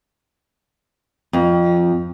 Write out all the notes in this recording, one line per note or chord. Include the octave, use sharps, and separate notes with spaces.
F2